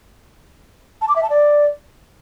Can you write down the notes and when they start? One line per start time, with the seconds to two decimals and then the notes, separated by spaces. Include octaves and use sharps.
1.01 A5
1.09 D6
1.16 E5
1.23 A5
1.30 D5